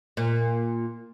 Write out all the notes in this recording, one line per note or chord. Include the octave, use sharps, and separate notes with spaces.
A#2